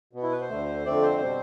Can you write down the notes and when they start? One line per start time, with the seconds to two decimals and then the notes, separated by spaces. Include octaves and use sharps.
0.13 B2 B3
0.23 E4
0.32 B4
0.41 C5
0.50 D2 D3 A3
0.86 F2 D3 A3 C4 D5
1.03 C5
1.21 B2 G3 C4